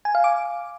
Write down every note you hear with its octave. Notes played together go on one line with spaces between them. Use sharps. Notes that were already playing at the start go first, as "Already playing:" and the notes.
G#5
F5
D6